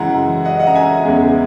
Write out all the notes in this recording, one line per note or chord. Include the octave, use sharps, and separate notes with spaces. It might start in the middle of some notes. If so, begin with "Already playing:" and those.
Already playing: F#2 C#3 E3 G#3 F#5 A#5
D#5 F#5
D#5 F#5
A#5
E5 G#5
E2 C#3 G#3 B3